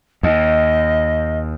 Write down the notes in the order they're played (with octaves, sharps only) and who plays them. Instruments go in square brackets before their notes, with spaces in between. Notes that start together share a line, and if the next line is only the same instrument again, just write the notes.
[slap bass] D#2 [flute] D#5